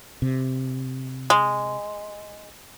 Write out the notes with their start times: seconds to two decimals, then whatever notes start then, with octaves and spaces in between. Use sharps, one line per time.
0.22 C3
1.30 G#3